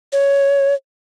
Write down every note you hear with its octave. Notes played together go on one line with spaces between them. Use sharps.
C#5